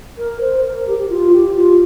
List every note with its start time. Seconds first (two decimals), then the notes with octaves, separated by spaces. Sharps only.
0.18 A#4
0.41 C5
0.64 A#4
0.87 G4
0.98 G4
1.09 F4
1.33 G4
1.56 F4